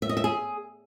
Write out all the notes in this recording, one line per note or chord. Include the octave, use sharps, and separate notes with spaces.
E5
D#5
E5
G#4